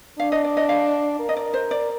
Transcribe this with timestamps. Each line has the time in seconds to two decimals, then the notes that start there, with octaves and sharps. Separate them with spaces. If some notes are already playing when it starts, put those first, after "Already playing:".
0.19 D4 F5
0.32 D#5
0.44 D5
0.57 D#5
0.69 F5
1.20 A#4
1.29 D#5
1.37 D5
1.54 C5
1.71 D5